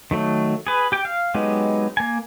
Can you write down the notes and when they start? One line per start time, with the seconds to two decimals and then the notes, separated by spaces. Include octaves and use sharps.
0.11 D#3 F#3 A3
0.67 G#4 B4
0.92 G4 G5
1.05 F5
1.34 F#3 G#3 B3 D#4 G4
1.97 A#3 G#5